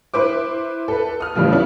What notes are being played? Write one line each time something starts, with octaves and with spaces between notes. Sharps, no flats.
E4 B4 C5 D6
A4 B4
D#6 F6
A1 A2 C#3 F3 G3
B3 C#4 D4 E4